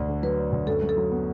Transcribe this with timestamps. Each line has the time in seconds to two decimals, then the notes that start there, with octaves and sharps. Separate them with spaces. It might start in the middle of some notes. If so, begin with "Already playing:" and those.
Already playing: D2 D4
0.08 D3
0.23 F#3 B4
0.38 D4
0.52 D2
0.67 F#2 A4
0.82 F#2
0.89 A4
0.97 F#3
1.11 B3